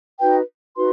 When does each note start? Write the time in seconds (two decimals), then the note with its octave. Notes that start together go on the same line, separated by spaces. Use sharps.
0.20 D#4 F#4 B4 G5
0.76 D#4 F#4 B4 C6